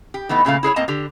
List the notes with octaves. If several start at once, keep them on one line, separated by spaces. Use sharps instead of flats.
G4
E3 A3 B3 D#4
A#2 C#3 A3 F5
E4 G#4 A#4 C#5
A2 A#3 C4 D#5 A5 A#5
D3 G4